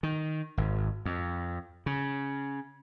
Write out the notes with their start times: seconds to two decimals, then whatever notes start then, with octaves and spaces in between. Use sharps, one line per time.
0.03 D#3
0.57 G#1
1.05 F2
1.86 C#3